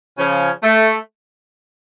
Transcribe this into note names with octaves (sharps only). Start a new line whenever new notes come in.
C#3 F3 C#4
A3